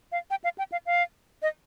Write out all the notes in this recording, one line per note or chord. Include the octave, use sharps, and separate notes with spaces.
F5
G5
F5
G5
F5
F5
D#5